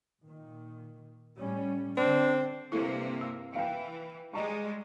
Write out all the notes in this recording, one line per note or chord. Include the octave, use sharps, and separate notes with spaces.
A#2 D#3
A2 G3 C#4
D3 C4 D4
G2 C3 A#3 E4 A4
E6
E3 F5 G5
G3 G#3 D#5 A#5 C#6